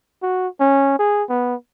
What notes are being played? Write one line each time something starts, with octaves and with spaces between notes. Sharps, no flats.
F#4
C#4
G#4
B3